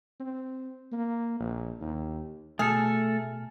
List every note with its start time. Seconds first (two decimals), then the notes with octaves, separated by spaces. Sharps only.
0.20 C4
0.92 A#3
1.40 A#1
1.81 D#2
2.59 B2 A3 G#4 A4 G#5 F6